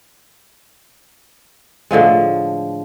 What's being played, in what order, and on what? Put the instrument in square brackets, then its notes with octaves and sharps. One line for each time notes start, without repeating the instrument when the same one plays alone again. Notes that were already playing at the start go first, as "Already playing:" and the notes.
[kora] A2 D3 F3 G#3